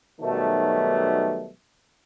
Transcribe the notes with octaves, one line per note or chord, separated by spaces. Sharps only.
B1 B2 D#3 F#3 G3 A3